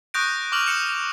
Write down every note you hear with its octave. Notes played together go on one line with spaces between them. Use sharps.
C#6 D#6 F#6 G6 A#6 D7
C#6 D6 F6 F7 F#7
D#6 C#7 E7